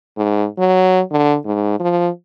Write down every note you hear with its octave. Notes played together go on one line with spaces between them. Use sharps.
G#2
F#3
D3
G#2
F3